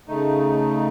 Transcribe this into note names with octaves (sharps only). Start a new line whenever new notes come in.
C#3 A3 D#4